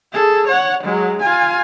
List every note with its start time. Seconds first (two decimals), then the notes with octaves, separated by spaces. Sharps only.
0.13 G#4 A4
0.48 C#5 F#5
0.84 F#3 G#3
1.22 F4 G#5